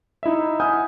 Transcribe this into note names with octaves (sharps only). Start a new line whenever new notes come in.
D#4 E4 D#5 E5
F#5 G#5 D#6 F6 G6